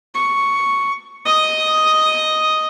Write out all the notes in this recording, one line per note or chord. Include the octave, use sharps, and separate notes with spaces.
C#6
D#5 D#6